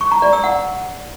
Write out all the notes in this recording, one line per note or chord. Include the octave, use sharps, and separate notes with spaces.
C#6
A#5
D5
E6
F#5